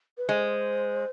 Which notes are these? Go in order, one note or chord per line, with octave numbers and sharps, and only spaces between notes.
B4
G#3 C5